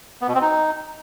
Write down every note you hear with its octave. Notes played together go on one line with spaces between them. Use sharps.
B3
B2
C4
D#4